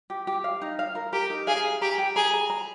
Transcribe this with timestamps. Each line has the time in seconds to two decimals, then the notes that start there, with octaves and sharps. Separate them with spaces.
0.10 G4
0.27 G4
0.44 F5
0.62 D#4
0.79 F5
0.95 A#4
1.13 G4 A#4
1.30 D#4
1.47 G#4 F5
1.64 F5
1.81 G4 A#5
1.98 G5
2.16 G#4 A#5
2.33 A#5
2.50 A#5